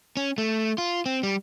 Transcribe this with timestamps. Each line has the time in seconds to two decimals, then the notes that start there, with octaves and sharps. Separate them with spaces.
0.17 C#4
0.38 A3
0.78 F4
1.06 C4
1.23 G3